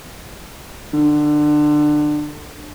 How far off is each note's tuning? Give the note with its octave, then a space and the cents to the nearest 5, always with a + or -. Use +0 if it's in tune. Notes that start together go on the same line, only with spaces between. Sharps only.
D3 +25